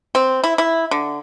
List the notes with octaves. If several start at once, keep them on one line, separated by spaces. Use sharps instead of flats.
C4
E4
E4
D3